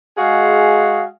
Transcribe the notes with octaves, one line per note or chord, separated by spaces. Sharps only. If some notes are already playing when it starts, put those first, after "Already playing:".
G#3 F#4 G#4 F5